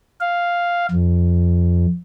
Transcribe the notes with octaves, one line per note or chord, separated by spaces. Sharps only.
F5
F2